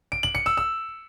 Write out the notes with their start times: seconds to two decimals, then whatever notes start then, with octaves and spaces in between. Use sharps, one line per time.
0.12 D7
0.23 F#7
0.35 C#7
0.46 E6
0.57 E6